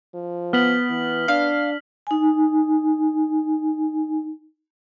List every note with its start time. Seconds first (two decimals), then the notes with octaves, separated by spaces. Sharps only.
0.14 F3
0.53 B3 F6 B6 F#7
0.89 E3
1.28 D4 F5
2.07 D#4 G#5